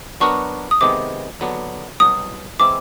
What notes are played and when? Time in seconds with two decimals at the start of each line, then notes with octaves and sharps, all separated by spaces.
0.20 F#3 B3 D4 F#4 A#4 C#6
0.71 D#6
0.81 C3 D#3 G#3 B3 D6
1.40 D#2 D3 F#3 B3 D4
2.00 C2 B2 F#3 D#6
2.59 E3 G#3 C4 E4 D6